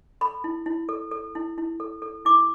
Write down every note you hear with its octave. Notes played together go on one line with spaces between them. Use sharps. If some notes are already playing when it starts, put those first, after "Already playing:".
A4 B5
E4
E4
A4
A4
E4
E4
A4
A4
E4 D6